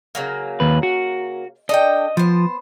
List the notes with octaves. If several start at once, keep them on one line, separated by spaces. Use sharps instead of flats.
C#3 F#3 A#3
D#2 B4
F#4
D4 A4 D#5 G5
F3 B3 C5